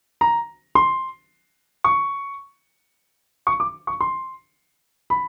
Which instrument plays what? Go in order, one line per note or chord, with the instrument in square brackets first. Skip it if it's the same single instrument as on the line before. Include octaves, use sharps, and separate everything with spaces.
[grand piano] A#5
C6
C#6
C#6
D6
C#6
C6
B5